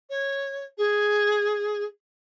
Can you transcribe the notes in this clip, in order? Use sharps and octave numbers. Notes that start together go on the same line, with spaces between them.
C#5
G#4